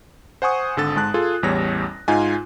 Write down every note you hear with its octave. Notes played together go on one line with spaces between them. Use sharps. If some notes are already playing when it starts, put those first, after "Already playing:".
C5 F#5 G#5 C#6 D#6
G#1 D3 A4 A6
G#2 G#3 A5 F#6
F4 G#4 A4
A1 E2 G3 C#5 A#6
G#2 D#4 F4 G#5